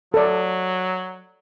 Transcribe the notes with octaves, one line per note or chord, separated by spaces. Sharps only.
F#3 A4 D5